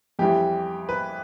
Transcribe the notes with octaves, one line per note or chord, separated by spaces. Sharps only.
F2 E3 G3 G4
B4